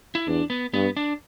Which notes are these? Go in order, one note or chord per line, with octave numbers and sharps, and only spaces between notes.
E4
E2 D4
B3
G2 B3
D4